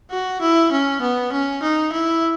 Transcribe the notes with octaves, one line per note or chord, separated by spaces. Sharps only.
F#4
E4
C#4
B3
C#4
D#4
E4